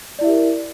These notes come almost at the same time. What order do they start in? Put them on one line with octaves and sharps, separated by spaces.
D5 E4 E5 G4 A#4